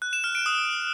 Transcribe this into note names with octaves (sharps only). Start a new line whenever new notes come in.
F#6
E7
F6
D7
D#6